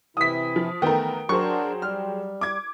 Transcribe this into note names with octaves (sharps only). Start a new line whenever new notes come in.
C3 E3 E4 D#6 B6
F3
D#3 E3 A3 B3 A#4 G5
F#3 D4 F#4 G#4 A#4 C5 C#6
G3 F6
D6 G#6